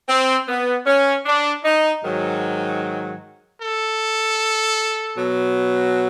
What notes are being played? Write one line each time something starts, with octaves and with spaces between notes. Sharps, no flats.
C4
B3
C#4
D4
D#4
G#2 D#3 F#3
A4
B2 F#3